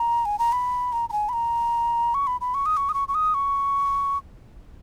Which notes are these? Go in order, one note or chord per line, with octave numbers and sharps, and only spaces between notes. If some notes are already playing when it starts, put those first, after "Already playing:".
Already playing: A#5
G#5
A#5
B5
A#5
A#5
G#5
B5
A#5
C#6
B5
B5
C#6
D#6
C#6
D#6
C#6
C#6
D#6
C#6